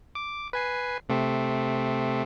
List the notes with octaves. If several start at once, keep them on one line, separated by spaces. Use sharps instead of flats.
D6
B4 G#5 C7
C3 A3 C4